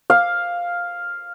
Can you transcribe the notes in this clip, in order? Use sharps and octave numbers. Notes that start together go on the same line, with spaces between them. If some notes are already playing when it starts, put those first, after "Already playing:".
F5